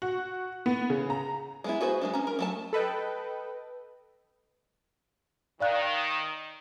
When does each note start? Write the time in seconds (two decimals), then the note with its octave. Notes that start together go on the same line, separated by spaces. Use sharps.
0.02 F#4
0.66 B3
0.90 C#3
1.10 A#5
1.64 G#3 B3 E4
1.81 F#4 G#4 B4 C5
2.01 G#3 A#3 D4
2.13 C#4 A#5
2.27 A#4
2.39 F#3 A3 A5
2.73 A4 B4 D#5 G5
5.60 D#3 D5 F5 F#6